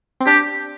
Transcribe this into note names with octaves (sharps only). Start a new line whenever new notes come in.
C4
D4 G4